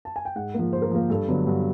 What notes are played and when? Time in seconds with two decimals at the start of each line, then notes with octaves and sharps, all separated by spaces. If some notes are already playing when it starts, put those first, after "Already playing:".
0.05 A5
0.16 G#5
0.25 G5
0.36 G#2 F#5
0.54 F3 A#3
0.73 G#2 C5
0.82 A#4
0.91 F3 A#3
1.10 G2 A4
1.28 D3 F#3 B3
1.47 G2